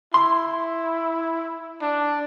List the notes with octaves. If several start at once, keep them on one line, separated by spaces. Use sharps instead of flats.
E4 C6
D4